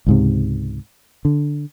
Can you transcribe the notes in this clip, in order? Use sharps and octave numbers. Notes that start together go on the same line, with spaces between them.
C#2 G#2 C3
D3